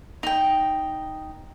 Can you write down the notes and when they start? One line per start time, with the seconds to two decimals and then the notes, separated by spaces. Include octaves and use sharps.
0.23 D#4 G5